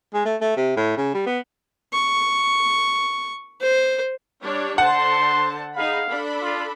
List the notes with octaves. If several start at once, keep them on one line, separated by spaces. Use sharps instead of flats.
G#3
A3
A3
C3
A2
C#3
G3
B3
C#6
C5
G3 D4 C#5
D3 C5 F#5 A5 C6
D#4 G#4 F5 B5
D4 A4 B5
F4